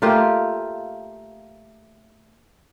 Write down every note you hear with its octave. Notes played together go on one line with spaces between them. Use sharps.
A3 A#3 F4 G4